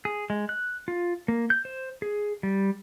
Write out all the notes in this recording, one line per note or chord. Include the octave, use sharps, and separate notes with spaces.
G#4
G#3
F#6
F4
A#3
G6
C5
G#4
G3